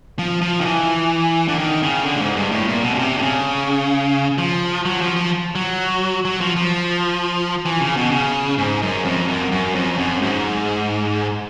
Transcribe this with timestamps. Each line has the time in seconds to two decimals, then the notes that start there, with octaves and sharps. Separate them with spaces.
0.19 F3
0.41 F3
0.61 D#3
0.65 E3
1.48 D3
1.58 D#3
1.83 C#3
2.06 D3
2.16 A2
2.21 G#2
2.36 G2
2.51 A2
2.68 A#2
2.83 B2
2.95 C#3
2.99 C3
3.17 D3
3.22 C#3
4.38 F3
4.85 F#3
5.01 F3
5.16 F3
5.55 F#3
6.25 F#3
6.41 F3
6.56 F3
7.65 E3
7.81 C#3
7.97 B2
8.11 C#3
8.58 G#2
8.82 F#2
9.05 F2
9.28 F#2
9.52 F#2
9.75 F2
9.98 F#2
10.22 G#2